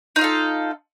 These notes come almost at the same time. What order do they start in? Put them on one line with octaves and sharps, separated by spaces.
D#4 F4 F5 A4